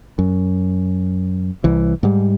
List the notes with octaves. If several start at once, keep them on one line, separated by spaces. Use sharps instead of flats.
F#2
C2 E3
G#2 G3